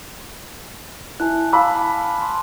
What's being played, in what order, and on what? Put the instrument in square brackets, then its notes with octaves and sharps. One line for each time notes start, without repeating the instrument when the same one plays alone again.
[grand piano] E4 [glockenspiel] G#5 A5 F#6
[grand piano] F5 B5 E6 [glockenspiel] A5 D6
[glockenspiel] C6